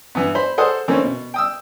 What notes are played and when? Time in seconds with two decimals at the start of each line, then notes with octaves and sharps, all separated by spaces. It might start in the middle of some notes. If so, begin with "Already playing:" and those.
0.15 G2 E3 B3
0.35 C5 B5
0.58 G#4 A4 C5 F#5 D#6
0.88 D3 E3 A3 A#3 C4 C#4
1.04 B2
1.34 G5 D#6 E6